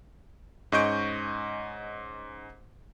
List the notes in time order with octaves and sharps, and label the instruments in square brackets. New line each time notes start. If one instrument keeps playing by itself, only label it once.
[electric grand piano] G#2 C#4 D#5 C#6 G6 D7